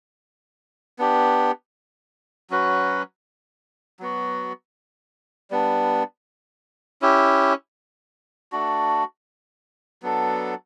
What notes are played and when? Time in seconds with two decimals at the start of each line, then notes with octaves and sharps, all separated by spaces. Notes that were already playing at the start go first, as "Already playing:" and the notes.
0.99 B3 D4 G4
2.50 F#3 C#4 F#4 B4
3.99 F#3 B3 F#4
5.51 G3 B3 D4
7.02 C#4 E4 G4
8.52 A3 D4 F#4
10.02 F#3 B3 D4 A4